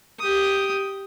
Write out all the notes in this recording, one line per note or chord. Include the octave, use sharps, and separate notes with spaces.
G4 D#6